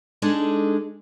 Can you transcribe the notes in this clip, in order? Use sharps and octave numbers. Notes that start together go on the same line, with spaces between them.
G#3 D4 D#4 G#4 A4